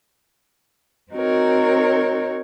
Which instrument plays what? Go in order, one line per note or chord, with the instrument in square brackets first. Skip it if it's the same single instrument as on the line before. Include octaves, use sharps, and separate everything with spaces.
[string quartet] C4 D#4 F#4 A#4 C#5